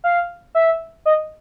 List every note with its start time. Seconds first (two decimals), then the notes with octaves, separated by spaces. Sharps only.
0.04 F5
0.55 E5
1.06 D#5